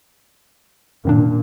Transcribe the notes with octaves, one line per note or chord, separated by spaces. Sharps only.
F#2 A#2 D#3 D4